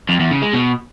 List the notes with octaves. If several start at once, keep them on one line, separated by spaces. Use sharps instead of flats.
F2
E2
C#3
G#3
B2